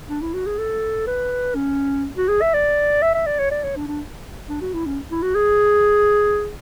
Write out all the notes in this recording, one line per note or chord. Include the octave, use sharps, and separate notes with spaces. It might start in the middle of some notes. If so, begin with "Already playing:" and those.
D4
E4
F#4
G#4
A4
B4
C#4
F#4
G#4
E5
D5
E5
E5
D5
C#5
D5
C#5
D4
D4
D4
F#4
E4
C#4
E4
F#4
G#4